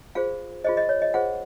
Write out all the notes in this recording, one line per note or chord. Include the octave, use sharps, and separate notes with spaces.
F4 G#4 C5 F5
F4 G#4 C5 D#5
D#5
C#5
D#5
F4 G#4 C5 F#5